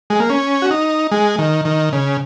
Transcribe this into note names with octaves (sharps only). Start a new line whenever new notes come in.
G#3
A#3
C#4
F#4
D#4
G#3
D#3
D#3
C#3